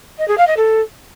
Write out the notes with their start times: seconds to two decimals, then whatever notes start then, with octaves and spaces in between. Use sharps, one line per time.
0.18 D#5
0.28 G#4
0.37 F5
0.47 D#5
0.56 A4